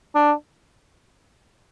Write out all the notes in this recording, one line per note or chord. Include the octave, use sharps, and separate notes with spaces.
D4